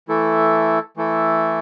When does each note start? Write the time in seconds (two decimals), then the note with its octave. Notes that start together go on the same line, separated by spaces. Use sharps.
0.08 E3 A3 E4 A4
0.97 E3 A3 E4 A4